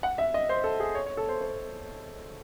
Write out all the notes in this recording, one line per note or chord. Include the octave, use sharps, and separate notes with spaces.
F#5
E5
D#5
C5
A4
G#4
C#5
C#5
A4
C5
C5